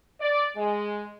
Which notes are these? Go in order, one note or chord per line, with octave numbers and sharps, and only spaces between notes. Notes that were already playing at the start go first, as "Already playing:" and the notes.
D5
G#3